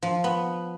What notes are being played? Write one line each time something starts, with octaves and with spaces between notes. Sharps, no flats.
F3
B3